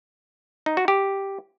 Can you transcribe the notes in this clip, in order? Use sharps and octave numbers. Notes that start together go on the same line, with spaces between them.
D#4
F#4
G4